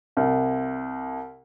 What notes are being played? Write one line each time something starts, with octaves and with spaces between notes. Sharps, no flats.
C2